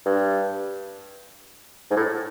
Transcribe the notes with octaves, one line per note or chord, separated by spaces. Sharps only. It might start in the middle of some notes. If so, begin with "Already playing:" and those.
G2
G#2
A2